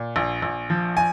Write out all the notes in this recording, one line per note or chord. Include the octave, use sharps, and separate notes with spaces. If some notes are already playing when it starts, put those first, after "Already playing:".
Already playing: A#2
A#1
A#1
F3
G#5